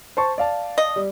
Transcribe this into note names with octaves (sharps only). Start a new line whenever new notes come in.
C5 A5 C#6
D5 F5 A5
D#5
G3